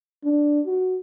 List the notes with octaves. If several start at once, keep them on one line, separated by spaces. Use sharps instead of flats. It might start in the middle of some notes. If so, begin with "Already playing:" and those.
D4
F#4